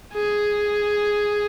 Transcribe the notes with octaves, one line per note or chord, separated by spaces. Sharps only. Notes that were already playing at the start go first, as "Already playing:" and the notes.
G#4